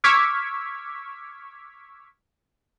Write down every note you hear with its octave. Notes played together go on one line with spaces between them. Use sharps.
C#6 D6 E6 F6 G#6 B6